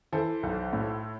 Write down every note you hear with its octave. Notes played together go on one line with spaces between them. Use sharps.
E3 A4 C5
B1
A2